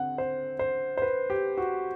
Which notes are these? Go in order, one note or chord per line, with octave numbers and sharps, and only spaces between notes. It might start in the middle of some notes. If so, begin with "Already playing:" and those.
Already playing: D3 C4 F#5
C5
C5
C5
B4
G4
F#4